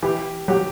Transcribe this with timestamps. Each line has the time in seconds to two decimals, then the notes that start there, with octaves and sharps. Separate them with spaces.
0.03 E3 G4
0.48 F#3 G4